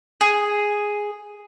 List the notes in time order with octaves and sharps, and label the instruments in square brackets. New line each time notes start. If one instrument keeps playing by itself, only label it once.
[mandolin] G#4